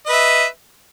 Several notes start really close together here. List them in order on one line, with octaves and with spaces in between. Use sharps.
D#5 B4 E5